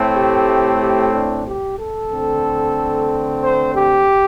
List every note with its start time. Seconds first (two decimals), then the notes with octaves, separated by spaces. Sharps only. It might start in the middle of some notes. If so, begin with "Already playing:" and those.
Already playing: A2 A3 C4
0.14 G4
0.79 G4
1.13 D4
1.46 G4
1.77 A4
2.11 D3 A3 C4
3.42 C5
3.74 G4